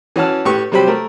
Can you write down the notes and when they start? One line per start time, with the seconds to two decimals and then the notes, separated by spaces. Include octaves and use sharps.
0.16 E3 C#4 F#4 A5 F6
0.45 A2 G4 B4 C#6
0.72 C3 F#3 G3 C5 G5 B5
0.87 A3 A#4